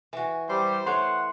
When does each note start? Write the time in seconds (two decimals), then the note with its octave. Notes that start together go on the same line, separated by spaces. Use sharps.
0.13 E3 F#4
0.49 G3 C5
0.86 A3 C#5 F#5 C6